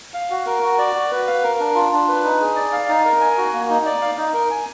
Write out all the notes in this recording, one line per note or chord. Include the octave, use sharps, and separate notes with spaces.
F5
F#4
A#4
F#4
D5
F#4
B4
F5
A#4
D4
F4
D4
B4
D#4
G#4
D5
F5
D#4
A#4
G#5
F#4
A#3
D#4
D5
F5
D#4
A#4
G#5